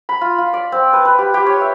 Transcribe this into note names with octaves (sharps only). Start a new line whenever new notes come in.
B5
F4
F4
D5
C4
B4
B4
G4
G4
C#5
E5